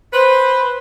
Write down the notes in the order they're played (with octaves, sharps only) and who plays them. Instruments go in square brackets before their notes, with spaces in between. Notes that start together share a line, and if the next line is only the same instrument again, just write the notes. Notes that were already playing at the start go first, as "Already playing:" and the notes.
[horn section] B4 C5